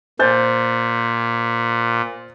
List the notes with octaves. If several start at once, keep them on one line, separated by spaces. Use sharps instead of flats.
A#2 C5 G6 A6